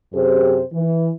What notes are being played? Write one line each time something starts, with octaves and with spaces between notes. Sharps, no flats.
F#2 C3 G4 G#4 C5
E3